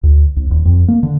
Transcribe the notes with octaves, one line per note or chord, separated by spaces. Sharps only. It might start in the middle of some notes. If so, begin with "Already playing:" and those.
D2
C2
D#1
F2
A#3
D3